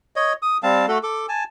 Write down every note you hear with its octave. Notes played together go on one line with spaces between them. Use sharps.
C#5 D#5
D#6
G3 C4 F5 A5
A3 F#4 A4
A4 D6
G#5 A5